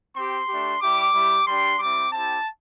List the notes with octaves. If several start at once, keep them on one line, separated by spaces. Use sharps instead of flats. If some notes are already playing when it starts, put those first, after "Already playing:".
C4 G4 C6
A3 D4 G4
G3 E4 G4 D6
G3 E4 G4
G3 D4 G4 C6
G3 C4 E4 D6
C4 E4 G4 A5